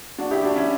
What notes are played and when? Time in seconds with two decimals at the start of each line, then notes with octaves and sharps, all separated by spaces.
0.18 D4 F#4
0.31 E4 G4
0.43 D4 F#4
0.56 C#4 E4